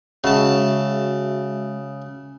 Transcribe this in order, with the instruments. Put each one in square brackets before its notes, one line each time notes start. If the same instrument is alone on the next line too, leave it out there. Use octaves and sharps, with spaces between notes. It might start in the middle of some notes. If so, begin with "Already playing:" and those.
[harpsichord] C#3 A5 [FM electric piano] G#3 F#4 E5